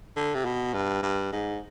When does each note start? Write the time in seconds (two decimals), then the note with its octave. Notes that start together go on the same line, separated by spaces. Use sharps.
0.16 D3
0.35 C3
0.45 B2
0.73 G2
1.03 G2
1.32 G#2